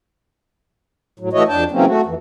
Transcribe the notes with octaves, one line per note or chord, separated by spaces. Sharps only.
A2 F#3
E3 A3 E4 F#4 C#5 D#5
F2 D4 G5 A5
C#3 E3 F#3 A#3 C4 C#4
A3 F#4
F2 E3